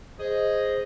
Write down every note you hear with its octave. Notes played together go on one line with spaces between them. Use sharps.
G#4 C5 D#5